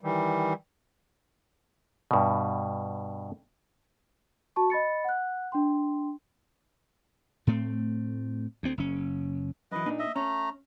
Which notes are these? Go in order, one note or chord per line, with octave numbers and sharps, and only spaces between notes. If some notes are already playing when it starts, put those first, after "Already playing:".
D#3 E3 G3
G2 B2
F#4 A5 C#6
D#5 B5 A6 C#7
F#5 F#6
D4 G5 C6
A2 A3 C4
D2 C4
F#1 C#4
F#2 E3 B4 D#5
A#2 D4 D#4
D#5 E5
A3 C#4 A#5